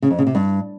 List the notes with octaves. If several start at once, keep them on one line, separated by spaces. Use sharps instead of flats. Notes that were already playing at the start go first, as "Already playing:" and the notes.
C#3
F2
C#3
C3
G2